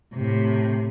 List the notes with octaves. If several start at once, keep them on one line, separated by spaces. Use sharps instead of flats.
A2 C3